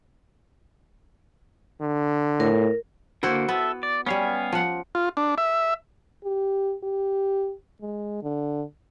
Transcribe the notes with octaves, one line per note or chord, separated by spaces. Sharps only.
D3
A2 A#4
D3 A#3 E4 F#4 C5
B3 A4 E5
D5
G3 B3 C#4 F5 G#5
F3 F#5
F4
D4
E5
G4
G4
G#3
D3